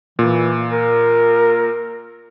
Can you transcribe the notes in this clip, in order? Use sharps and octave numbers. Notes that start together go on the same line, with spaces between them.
A#2 E3
A#4